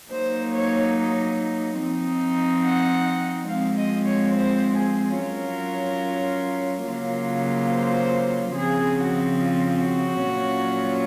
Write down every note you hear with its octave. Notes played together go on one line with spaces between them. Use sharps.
F#3 A#3 D#4 C5
C#5
F3 C4 D#4
F#5
F3 G#3 C4 F5
D#5
C#5
C5
G#4
F#3 C#4 F4 A#4
C#3 F#3 A#3 F4
C5
C#3 F3 C4 G#4
F#4
F4
F#4
A#2 F#3 C#4 F4